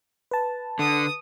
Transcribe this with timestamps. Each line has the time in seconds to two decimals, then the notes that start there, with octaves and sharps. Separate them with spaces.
0.31 B4 A5
0.79 D3 D#6